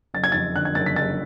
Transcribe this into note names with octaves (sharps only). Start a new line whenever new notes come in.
F#1 A6
G#6
F2 A6
D3 F#6
G#6
F#1 A6
B6
F#1 A6